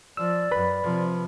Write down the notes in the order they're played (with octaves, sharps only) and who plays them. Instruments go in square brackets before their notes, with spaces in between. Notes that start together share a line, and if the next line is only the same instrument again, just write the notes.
[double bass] F3 [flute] D5 [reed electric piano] E6
[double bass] F#2 [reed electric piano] B4 B5
[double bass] C3 F3